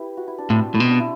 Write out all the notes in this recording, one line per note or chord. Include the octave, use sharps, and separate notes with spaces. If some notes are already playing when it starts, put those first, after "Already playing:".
Already playing: E4 G4 B4
F#4
E4
D4
A2 C4
A2
B2 C4
D4
E4